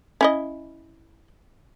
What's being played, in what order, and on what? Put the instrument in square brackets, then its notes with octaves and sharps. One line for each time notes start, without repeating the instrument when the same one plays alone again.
[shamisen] C#4 E4 D#5